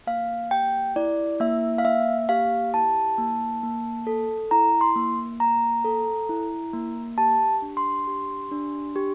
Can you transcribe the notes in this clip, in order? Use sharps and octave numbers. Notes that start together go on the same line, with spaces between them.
A#3 F5
G4 G5
E4 D5
A#3 E5
F5
A#3 E5
G4 F5
E4 A5
A#3
A#3
A4
E4 A#5
C6
A#3
A#3 A#5
A4
E4
A#3
G4 A5
D4
C6
G4
D4
G4